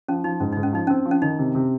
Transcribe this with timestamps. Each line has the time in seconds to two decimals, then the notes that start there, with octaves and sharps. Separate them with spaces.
0.08 F3 C#4
0.24 F3 D#4
0.40 G#2 C#4
0.53 G#2 D#4
0.63 C#4
0.73 F3 D#4
0.87 C4 C#4
1.05 F3
1.11 C#4
1.22 D#3 D#4
1.39 C3
1.55 C3